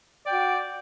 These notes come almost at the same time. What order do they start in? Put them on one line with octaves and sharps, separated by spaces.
D5 G5 F#4